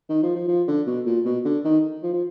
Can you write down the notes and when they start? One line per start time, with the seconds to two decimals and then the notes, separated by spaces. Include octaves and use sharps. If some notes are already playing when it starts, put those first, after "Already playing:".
0.09 D#3
0.23 F3
0.35 F3
0.48 F3
0.68 D3
0.87 B2
1.06 A#2
1.25 B2
1.45 D3
1.64 D#3
2.03 F3
2.13 F3